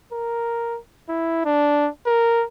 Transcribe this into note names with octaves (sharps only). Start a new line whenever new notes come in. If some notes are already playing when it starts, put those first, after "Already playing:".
A#4
E4
D4
A#4